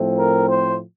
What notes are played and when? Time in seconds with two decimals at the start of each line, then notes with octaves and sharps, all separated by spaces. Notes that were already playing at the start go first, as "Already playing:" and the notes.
Already playing: A2 F3 A3 C4
0.19 A#4
0.50 C5